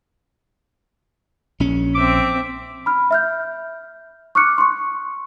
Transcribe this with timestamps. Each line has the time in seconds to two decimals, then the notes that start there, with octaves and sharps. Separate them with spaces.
1.60 A#1 C#4
1.94 C4 E5 D6
2.86 B5 F6
3.11 E5 F6 G6
4.35 C#6 D6 F6 F#6 C#7
4.58 C6 C#6